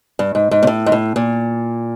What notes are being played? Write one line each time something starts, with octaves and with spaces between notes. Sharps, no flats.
G2
G#2
G#2
A#2
A2
G#2
A2
A#2